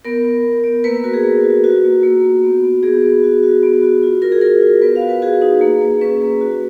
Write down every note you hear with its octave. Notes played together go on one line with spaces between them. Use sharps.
B3 A#4
B3
B3
B3
A#3 B4
B4
F#4 A#4
G#4
A#3
F#4
F4 F#4
A#3
A#3
F4
B3
B3
B3 G#4
B3
F#4
F#4
B3
F#4
F4
F4 A#4
G#4
F4 A#4
F4
B3 B4
F5
F#4
B4
F#4 G#4
D#4
A#3
A#3
C#4 B4
A#3
F#4